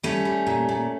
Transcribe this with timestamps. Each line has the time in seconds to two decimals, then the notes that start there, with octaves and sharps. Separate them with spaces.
0.03 G3 A3 C#4
0.25 G3
0.47 A#2
0.69 A#2